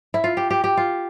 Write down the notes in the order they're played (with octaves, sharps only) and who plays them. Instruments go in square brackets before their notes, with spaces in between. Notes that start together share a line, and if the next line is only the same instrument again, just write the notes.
[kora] E4
F4
G4
G4
G4
F4